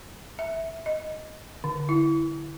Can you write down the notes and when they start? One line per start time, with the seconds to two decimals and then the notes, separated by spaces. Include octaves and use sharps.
0.39 E5
0.86 D#5
1.64 D3
1.89 E4